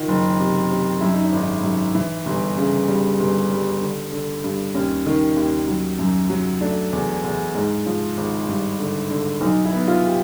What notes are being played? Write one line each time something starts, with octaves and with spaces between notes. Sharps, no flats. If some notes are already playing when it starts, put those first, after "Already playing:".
Already playing: D#3 F4
F#1
C3
C3
F#2 E4
D#4
D4
G#1
D#4
F#2
E3
G1
C#3
G3
G1
G3
D3
D3
G2
D#2 C#4
D#3
D#2
F#3
F#2
F#3
A3 D4
E2
E2
G#2
F3
G#1
G2
D3
D3
B1 D#4
E4
B3
F4
G4